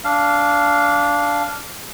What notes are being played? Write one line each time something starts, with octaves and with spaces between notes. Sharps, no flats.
D4 F5